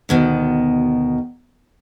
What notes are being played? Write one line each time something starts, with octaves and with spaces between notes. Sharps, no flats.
D2 B2 D#3